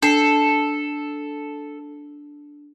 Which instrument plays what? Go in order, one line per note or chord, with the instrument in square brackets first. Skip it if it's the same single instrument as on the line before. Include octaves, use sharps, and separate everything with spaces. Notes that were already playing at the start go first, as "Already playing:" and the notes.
[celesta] D4 C7 [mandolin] A4